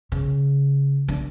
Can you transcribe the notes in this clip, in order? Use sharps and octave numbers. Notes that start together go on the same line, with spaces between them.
C#3
D4